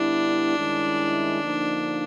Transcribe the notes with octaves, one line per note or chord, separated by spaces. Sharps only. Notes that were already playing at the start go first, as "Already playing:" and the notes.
Already playing: D3 G3 B3 D4 E4
G2 D#3 G#3 C#4 E4
D3 F3 A#3 D#4